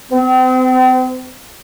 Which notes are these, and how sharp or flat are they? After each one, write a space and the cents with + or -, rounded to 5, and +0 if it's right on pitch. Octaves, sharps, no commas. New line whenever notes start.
C4 -40